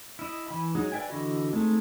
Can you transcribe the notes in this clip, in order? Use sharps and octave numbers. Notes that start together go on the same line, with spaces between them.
E4 D#5
E3 B5
F#3 G#3 D#4 G#4
B4 D5 E5 G5 G#5
D3 E3 F#4 D#5 B5
G#3 A3 C4 D#4